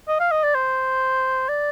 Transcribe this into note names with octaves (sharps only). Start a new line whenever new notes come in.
D#5
F5
D#5
D5
C5
D5